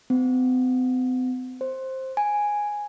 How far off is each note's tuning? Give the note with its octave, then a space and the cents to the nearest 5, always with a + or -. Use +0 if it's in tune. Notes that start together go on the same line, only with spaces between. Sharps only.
C4 -45
C5 +10
G#5 -5